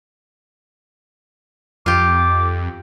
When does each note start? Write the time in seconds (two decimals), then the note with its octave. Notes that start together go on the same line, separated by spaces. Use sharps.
1.86 F2 F4 G4 D6